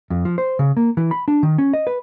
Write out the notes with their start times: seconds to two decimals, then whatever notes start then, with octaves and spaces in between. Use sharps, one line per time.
0.10 F2
0.25 F3
0.38 C5
0.59 C#3
0.77 A#3
0.97 E3
1.11 B5
1.28 D4
1.43 D#3
1.58 C#4
1.73 D#5
1.87 B4